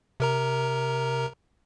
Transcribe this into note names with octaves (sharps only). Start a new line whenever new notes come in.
C3 A#4 A#5